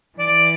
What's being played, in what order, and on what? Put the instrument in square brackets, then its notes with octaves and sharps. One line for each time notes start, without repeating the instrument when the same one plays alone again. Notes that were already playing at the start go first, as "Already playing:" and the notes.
[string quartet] E3 [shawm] D5